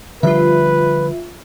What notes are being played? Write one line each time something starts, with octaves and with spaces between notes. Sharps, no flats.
D3 F3 G3 F4 B4 E5